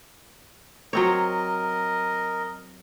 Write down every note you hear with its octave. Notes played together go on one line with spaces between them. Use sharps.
F#3 C4 A#4 C#5 D#5